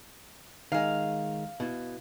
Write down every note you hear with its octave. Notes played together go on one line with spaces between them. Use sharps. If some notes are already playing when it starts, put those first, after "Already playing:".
D#3 G#3 F5
B2 E4